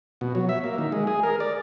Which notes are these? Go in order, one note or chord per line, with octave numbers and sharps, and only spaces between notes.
B2
F#3
E5
A#3
D#3
G#3
G#4
A#4
D5